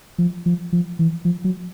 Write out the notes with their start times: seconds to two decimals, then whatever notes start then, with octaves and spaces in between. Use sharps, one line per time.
0.18 F3
0.46 F3
0.73 F3
0.99 E3
1.25 F3
1.44 F#3